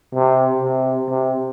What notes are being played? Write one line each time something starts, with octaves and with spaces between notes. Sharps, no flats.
C3
C3
C3